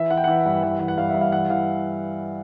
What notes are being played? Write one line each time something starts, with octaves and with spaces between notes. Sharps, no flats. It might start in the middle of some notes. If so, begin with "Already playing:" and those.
Already playing: E3 E5
E3 F#5
G5
E3 F#5
G2
E3 F#5
E3
F#5
G2 F5
G2 E5
F5
E3 F#5
E3 F5